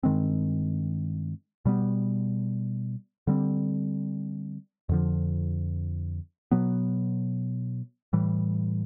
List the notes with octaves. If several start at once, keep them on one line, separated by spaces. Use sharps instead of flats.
G2 D#3 G#3 C4
B2 G3 B3
D3 G3 C4
F2 D3 F3
B2 F#3 B3
A2 E3 G3